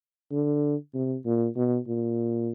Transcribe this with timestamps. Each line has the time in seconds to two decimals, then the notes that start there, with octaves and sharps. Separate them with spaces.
0.32 D3
0.94 C3
1.25 A#2
1.56 B2
1.87 A#2